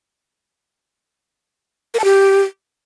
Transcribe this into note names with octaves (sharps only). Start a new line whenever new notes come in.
A#4
A5
G4